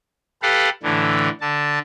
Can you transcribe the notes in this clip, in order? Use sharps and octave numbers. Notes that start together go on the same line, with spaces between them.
G4 A4 B4 F5 F#5
A2 D3 E3
D3 A5